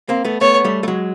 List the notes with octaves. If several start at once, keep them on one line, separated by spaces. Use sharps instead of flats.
A#3 C4
A3 B3
A3 B3 C#5
G3 A3
A3
F#3 G#3